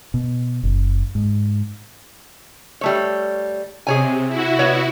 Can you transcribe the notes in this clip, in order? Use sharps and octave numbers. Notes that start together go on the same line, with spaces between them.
B2
F#1
G#2
G3 A3 C#5
C3 G#4 C#5 G#5
E4 F#4
B3 C#5